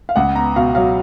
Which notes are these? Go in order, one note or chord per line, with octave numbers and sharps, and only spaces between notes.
F5
C#2 F#5
B3 A#5
B2 F5
F#3 F5